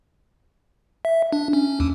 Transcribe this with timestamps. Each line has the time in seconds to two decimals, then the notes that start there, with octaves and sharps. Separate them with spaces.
1.05 E5
1.33 D4
1.53 C#4
1.80 D#2